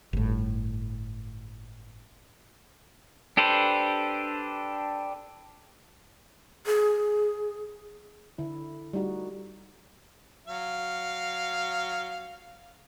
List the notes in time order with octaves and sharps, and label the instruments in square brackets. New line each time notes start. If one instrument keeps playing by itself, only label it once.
[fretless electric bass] G1 A2
[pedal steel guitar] D4 G4 A4 B4 C5
[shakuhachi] G#4
[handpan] D3 E4
G3 A3 D#4 F#4 G4
[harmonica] F#3 F5